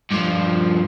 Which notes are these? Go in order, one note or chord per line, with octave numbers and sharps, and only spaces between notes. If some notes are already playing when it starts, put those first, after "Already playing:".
G2 F3